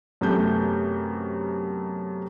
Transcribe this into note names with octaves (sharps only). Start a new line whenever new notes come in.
F#2 C3 A3 B3 G4 G6